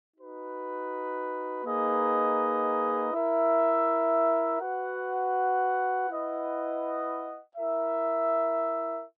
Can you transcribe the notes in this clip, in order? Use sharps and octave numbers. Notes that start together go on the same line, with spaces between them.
D#4 F#4 B4
A#3 D#4 G#4 B4 D#5
E4 A#4 E5
F#4 B4 F#5
E4 B4 D#5 F#5
E4 A#4 E5